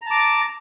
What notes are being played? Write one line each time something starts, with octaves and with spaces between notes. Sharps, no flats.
A5 A#5 D6